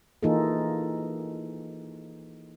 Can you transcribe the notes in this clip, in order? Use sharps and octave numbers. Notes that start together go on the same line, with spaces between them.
E3 A#3 D#4 F4 G#4 A4